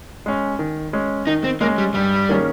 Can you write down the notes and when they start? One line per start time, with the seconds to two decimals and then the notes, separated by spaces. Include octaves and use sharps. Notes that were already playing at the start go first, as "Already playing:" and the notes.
0.26 G#3 C#4
0.59 D#3
0.93 G#3 C#4
1.27 D#3 D#4
1.44 C4
1.61 G#3 A#3 C#4
1.78 G3
1.94 G2 G3
2.29 D#3 A#3 C#4 G#4